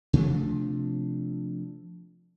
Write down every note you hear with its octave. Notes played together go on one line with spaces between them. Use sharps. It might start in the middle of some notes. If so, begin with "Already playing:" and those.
C3 F3 A3 D4